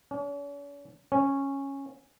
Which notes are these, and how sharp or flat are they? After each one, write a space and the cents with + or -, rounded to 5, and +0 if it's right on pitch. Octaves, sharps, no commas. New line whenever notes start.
C#4 +45
C#4 -10